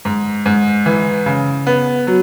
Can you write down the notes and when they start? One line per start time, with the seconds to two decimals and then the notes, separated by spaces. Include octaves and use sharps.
0.05 G#2
0.46 G#2
0.86 E3
1.26 C#3
1.67 B3
2.07 F#3